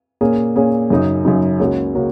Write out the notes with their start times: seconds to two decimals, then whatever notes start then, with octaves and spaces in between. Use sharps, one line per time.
0.21 A#2 A#3 C#4 G#4
0.56 A#2 A#3 C#4 G#4
0.90 F#2 C#3 F#3 D#4
1.25 F#2 C#3 F#3 D#4
1.60 C#2 C#3 A#3 F#4 C#5
1.95 C#3 A#3 F#4 C#5